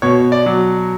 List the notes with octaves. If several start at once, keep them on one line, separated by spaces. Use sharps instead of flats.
B2 C#5
D5
F#3